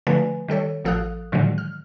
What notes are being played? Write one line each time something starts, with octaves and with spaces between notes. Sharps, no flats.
D3 F3 A3 B4 G#5
D#3 G3 A4 C#5
A1 F3 A4 F5 D#6 F#6
A2 D3 D#3 F3 F#3 G#3
F6